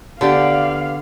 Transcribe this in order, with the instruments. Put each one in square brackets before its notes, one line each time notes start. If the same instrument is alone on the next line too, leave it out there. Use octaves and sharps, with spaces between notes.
[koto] D3 [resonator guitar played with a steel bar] B3 G4 D5 [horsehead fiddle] F5